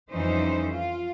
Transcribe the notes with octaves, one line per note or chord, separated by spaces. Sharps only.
F2 E3 G3 C#4 D#4 C5
F4